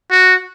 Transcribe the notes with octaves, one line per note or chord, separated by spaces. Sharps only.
F#4